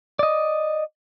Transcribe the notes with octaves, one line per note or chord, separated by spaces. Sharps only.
D5 D#5